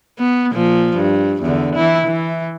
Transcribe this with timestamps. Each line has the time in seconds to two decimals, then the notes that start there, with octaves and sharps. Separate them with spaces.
0.18 B3
0.52 A#2 F3
0.96 G2
1.43 E2 D3
1.75 E3 E4
2.06 E3